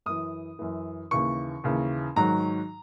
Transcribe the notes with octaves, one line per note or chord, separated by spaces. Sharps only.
F#2 E3 D#6
F#2 E3
D#2 C#3 E3 C#6
D#2 C#3 E3
G#2 D#3 F#3 A#5